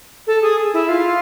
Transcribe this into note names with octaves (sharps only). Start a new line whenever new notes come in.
A4
G#4
E4
F4